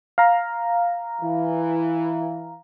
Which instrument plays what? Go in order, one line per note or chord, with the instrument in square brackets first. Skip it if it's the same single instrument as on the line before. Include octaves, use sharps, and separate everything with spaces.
[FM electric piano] F5 A#5
[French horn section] E3